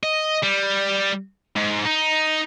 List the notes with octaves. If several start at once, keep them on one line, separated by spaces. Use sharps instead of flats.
D#5
G3
G#2
D#4